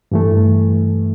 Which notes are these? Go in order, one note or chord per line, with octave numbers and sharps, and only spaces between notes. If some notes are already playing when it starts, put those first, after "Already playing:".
G2 E3 A3